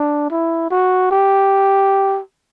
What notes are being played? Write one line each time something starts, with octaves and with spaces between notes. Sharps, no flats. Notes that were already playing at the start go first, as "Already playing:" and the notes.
Already playing: D4
E4
F#4
G4